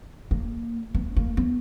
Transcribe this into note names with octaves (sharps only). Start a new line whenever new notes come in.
A#3
B3
A#3
B3